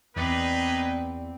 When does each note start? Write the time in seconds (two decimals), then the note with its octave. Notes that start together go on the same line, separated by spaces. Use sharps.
0.16 E2 B3 C4 D#4 G#4 B4 D5